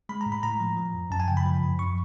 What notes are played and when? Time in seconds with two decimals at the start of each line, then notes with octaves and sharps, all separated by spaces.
0.09 G#3 B5
0.21 A#5
0.26 A2
0.32 B5
0.43 A2 A#5
0.60 F3
0.77 F3
0.94 F#2
1.11 F#2 A5
1.20 G#5
1.28 C#3 G5
1.37 B5
1.46 F3
1.62 F#2
1.79 F#2 C#6